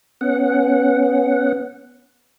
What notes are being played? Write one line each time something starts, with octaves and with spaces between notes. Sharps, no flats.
B3 C#4 F#5